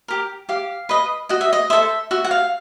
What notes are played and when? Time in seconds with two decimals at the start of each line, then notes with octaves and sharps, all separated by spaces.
0.08 G4 A#4
0.49 G4 F5
0.89 B4 D#5
1.29 F#4 D#5
1.41 E5
1.53 D#5
1.70 A4 C5 E5
2.11 F#4 E5
2.24 F#5
2.31 F5